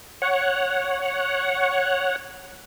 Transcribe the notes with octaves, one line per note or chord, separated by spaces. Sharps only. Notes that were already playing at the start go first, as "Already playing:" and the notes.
C#5 F#5